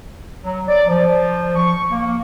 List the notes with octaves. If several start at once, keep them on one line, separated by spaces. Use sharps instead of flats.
F#3
D5
F3
C#6
A#3